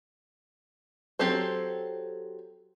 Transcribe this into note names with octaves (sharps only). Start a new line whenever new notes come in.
F#3 C4 G4 A4 C5